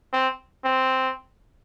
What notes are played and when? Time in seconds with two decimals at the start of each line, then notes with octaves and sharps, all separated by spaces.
0.13 C4
0.65 C4